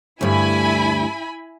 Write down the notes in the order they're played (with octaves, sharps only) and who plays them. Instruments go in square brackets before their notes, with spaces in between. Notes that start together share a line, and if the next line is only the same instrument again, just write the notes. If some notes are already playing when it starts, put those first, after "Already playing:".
[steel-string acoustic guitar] D2 G2 [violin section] E4 G#5 B5